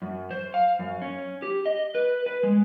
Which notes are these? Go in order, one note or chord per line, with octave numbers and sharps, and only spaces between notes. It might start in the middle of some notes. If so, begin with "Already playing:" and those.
F#2
C5
F5
F#2
C#4
G4
D#5
B4
B4
G#3